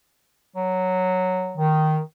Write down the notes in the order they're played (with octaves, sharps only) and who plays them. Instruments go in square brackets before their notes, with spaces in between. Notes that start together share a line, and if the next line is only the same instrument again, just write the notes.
[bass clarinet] F#3
[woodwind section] D#3